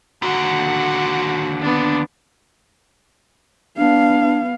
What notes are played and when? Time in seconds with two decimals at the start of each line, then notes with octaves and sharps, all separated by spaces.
0.22 D#2 D3 F#4 F#5
1.60 B3 D4
3.77 B3 D4 F5